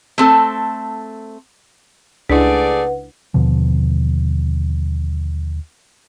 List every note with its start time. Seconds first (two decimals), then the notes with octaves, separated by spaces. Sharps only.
0.18 A3 C4 A4
2.30 C#2 A3 D4 E4 G#4 B4 D5 F#5
3.34 D#2 B2 D3 F3